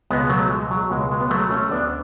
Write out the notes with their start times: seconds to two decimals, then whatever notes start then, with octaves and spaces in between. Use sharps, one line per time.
0.10 C#2 B2 G#3 B3
0.30 F#3 A3
0.51 G#3
0.71 F#3
0.91 C#2 B2 G#3
1.11 G#3
1.21 B3
1.30 F#3 A3
1.51 A3 C#4
1.71 D2 D3 B3 D4